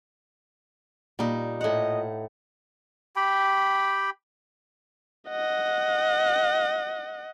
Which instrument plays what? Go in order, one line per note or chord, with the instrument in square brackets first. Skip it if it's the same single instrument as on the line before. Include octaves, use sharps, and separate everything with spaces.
[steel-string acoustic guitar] A#2 [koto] G3 D#4
[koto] A2 F#5 [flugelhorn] D#5
[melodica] G4 G5 B5
[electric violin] D#5 F#5